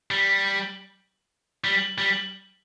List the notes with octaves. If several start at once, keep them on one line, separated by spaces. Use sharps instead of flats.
G3
G3
G3